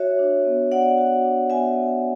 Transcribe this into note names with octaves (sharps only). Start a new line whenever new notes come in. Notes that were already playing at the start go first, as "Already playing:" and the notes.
Already playing: F#4 C#5 E5
D4
B3
B3 D5 F#5
F#4
D4
B3 E5 G#5
B3